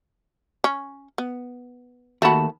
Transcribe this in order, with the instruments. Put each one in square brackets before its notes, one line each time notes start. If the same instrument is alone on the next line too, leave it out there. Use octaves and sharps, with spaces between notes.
[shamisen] C#4
B3
[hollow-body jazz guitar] D#2 A5 B5 [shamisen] A3 F#4